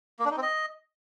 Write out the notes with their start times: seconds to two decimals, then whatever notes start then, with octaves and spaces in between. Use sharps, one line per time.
0.19 A#3
0.25 D4
0.31 D#4
0.37 C4
0.43 D#5